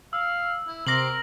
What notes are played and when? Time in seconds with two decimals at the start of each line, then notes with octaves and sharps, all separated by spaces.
0.13 F5 E6
0.68 E4
0.87 C3 A#4 C6 D6 A#6 F#7